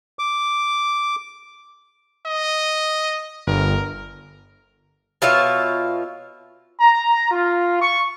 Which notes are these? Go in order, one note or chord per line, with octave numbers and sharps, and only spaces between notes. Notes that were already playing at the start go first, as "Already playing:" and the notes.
D6
D#5
G1 A#4
B2 F4 C#5 E5
A#5
F4
C#6